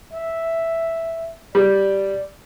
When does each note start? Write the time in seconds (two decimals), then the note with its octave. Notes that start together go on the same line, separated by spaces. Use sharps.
0.13 E5
1.55 G3 D5